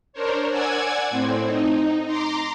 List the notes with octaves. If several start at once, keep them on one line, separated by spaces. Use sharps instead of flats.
D4 A#4 C5 C#5
D5 F#5 G#5 E6 G#6
A2 C4
D#4
A#5 C6 D6